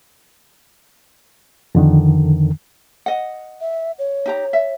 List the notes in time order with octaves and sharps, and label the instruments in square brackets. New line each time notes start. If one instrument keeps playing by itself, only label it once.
[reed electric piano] F2 D3 D#3
[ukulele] D#5 F#5
[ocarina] E5
C#5
[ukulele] D#4 G4 A#5
E5